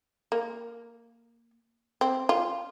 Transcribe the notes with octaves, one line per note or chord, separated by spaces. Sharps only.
A#3
C4
F4